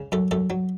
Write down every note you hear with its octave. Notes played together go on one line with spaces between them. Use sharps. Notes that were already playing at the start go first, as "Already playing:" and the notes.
Already playing: C#3
F#2 A4
F#2 A4
F#3